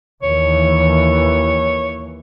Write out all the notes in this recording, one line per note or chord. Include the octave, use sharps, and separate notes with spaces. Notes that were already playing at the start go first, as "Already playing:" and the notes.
D#2 E3 C#5